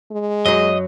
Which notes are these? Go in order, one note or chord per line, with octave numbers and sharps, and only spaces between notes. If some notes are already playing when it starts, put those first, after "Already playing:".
G#3
F#2 F#3 D#5